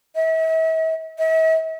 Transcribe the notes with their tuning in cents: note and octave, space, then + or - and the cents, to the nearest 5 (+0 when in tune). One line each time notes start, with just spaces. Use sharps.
E5 -40
E5 -45